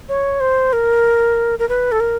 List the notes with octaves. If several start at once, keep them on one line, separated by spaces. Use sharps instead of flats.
C#5
C5
A#4
A#4
B4
A4
A#4